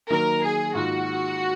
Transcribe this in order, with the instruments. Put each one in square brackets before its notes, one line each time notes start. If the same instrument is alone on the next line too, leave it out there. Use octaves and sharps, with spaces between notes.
[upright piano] D#3 F#3 A#3 [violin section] A#4
[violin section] G#4
[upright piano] G#2 D#3 A#3 F4 [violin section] F#4